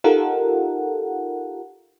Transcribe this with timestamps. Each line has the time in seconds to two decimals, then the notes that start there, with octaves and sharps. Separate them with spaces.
0.04 D#4 F4 G4 A4 A#4 F#5